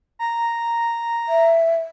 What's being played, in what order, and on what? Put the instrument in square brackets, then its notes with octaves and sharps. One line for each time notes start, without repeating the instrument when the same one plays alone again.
[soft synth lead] A#5
[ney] E5